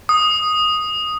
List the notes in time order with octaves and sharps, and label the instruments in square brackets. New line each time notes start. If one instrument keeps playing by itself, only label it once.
[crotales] D#6